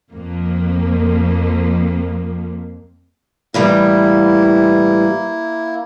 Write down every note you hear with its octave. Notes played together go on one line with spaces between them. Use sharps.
F2 A#3
A2 E3 G3 A#3 E4